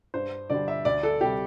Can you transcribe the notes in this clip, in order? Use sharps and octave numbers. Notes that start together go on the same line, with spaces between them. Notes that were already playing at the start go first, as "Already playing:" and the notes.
G2 C5
D3 G3 D5
E5
D2 D5
A4
C3 G3 G4